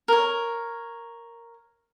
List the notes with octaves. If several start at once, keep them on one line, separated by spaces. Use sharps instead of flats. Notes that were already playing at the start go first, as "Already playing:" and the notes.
A#4 C#5